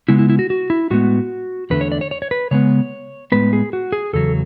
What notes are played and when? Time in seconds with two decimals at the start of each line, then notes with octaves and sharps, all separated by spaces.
0.09 C#3 G#3 B3 E4
0.19 E4
0.30 E4
0.39 F#4
0.50 F#4
0.70 E4
0.90 A2 G#3 B3 F#4
1.70 E2 D3 A3 B4
1.81 C#5
1.92 D5
2.01 C#5
2.11 C#5
2.22 C#5
2.31 B4
2.51 C#3 G#3 B3 C#5
3.32 A2 G#3 B3 B4
3.53 G#4
3.73 F#4
3.92 G#4
4.13 E2 C#3 F#3 A4